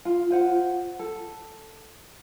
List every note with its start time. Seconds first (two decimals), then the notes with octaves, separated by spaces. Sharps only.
0.05 F4
0.30 F4 C5 F#5
0.99 A4